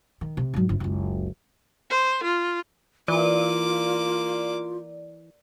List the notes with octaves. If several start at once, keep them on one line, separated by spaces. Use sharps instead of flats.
D#3
C3
G#2 F#3
G1 C3
F#1 C#2
C5
F4
E3 A#3 F4 D5 D6